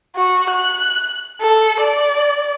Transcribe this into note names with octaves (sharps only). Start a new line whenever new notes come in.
F#4
F#6
A4
D5